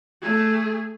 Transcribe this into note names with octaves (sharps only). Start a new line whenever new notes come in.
A3 G#4